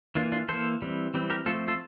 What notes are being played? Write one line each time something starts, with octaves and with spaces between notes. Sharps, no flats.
E3 A#3 D4 F4
D4 F4
E3 A#3 A4 C5
E3 G3 C4
E3 G3 C4
G4 A#4
F3 A3 C4 F4 A4
F4 A4